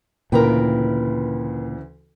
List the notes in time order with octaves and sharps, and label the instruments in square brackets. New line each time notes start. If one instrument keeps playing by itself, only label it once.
[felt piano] D2 C#3 E3 [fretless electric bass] A#2 [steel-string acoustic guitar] A#4 B4 G5